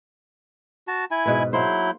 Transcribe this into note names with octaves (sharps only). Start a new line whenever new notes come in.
F#4 A5
E4 G#5
G#2 B2 B4
F#3 A#3 E4 C5 G6